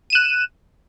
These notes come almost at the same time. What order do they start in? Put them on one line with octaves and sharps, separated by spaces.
D#7 E7 F#6